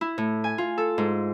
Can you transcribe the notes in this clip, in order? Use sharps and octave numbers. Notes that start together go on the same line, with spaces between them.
E4
A2
G#5
F4
A4
G#2